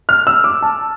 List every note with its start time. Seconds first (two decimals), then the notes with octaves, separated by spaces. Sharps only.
0.09 F6
0.27 E6
0.44 D6
0.62 A5